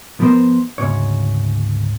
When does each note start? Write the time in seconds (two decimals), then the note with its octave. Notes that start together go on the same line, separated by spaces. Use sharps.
0.20 F3 B3 A#4 C5
0.78 D2 G#2 C#3 C#5